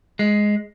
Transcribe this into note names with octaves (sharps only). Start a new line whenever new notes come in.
G#3